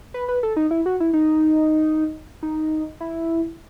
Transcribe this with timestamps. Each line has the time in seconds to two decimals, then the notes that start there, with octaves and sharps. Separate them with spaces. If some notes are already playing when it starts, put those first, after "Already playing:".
0.14 B4
0.28 B4
0.43 A4
0.56 D#4
0.71 E4
0.86 F#4
1.00 E4
1.13 D#4
2.43 D#4
3.01 E4